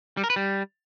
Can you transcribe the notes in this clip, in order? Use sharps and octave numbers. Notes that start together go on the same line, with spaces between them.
G3
A#4
B4
G3